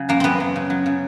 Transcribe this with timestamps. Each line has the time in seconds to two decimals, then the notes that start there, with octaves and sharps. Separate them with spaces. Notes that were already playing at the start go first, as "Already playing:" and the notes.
Already playing: C#3 F#3
0.09 F#2 A#3
0.20 F#2 B3 C4
0.40 F#3
0.56 C#3
0.70 F#3
0.86 C#3